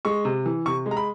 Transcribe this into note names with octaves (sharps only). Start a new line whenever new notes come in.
G#3 C#6
C3
E3
C3 C#6
G#3
A#5
B5